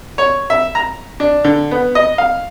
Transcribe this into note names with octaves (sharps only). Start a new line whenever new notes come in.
C#5
E5
A#5
D4
D3
B3
D#5
F5